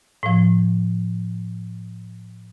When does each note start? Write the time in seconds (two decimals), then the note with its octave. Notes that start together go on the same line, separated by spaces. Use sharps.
0.23 A2 F3